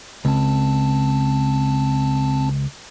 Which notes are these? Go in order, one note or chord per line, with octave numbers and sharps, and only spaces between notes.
C#2 C4 A5